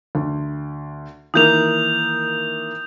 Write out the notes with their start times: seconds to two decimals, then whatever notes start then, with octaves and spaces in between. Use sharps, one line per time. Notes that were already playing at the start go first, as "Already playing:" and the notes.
0.15 D2
1.34 D#3 E3 A#3 D#6 G6 F7